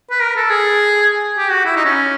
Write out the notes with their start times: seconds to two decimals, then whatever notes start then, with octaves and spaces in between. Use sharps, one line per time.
0.11 B4
0.21 A#4
0.36 A4
0.50 G#4
1.37 G4
1.51 F#4
1.65 E4
1.76 D#4
1.85 C#4